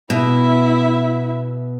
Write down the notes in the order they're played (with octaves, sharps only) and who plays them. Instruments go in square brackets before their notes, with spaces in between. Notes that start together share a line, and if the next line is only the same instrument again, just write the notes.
[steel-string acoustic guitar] B2 [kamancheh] E4 E5